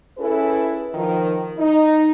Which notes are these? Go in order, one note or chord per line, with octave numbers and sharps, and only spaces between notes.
C#4 E4 G#4 A4 B4
D#3 F3
D#4